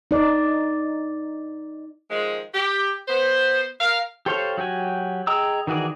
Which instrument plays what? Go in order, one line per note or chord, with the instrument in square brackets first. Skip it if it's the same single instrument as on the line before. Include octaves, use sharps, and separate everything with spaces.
[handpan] D#4 D5
[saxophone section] D#3 F3 G#3
G4
B3 C5
A#4 F5
[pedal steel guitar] G4 A4 C5 C#5 F5
F#3 F#4 G4 G#5
G#4 D#5 G5 A#5 E6
D#3 E3 F#4 G#4 D5